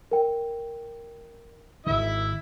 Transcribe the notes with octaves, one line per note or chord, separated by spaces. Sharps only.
A#4 G5
G#1 D#3 E4 E5